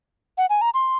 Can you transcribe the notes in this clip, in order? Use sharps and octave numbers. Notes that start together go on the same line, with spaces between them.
F#5
G#5
A#5
C6